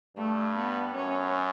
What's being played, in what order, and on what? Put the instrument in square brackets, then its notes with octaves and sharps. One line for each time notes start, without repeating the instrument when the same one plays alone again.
[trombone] G2 [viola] A3
[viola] B3
[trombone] F#2 [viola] C#4